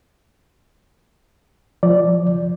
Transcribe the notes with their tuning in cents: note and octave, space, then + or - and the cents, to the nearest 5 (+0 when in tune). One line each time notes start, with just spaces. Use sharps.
F3 -5 D5 +0